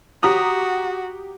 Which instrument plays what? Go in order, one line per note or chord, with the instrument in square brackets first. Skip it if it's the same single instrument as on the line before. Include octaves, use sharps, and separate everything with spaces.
[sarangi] F#4 [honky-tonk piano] G4 A#5 D#6